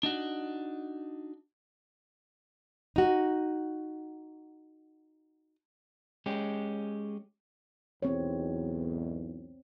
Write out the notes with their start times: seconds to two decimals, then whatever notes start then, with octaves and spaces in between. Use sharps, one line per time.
0.03 D4 D#4 F#4
2.96 D#4 F#4
6.26 G#3 C#4 G4
8.02 B1 E2 G#2 C4 C#5